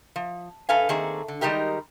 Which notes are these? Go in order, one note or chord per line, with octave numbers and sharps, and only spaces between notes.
F3
G2 A4 B4 F5 G#5
D#3 A3 A#3 C4 G#4
D3
D#3 G3 G#3 D#4 G4 A#4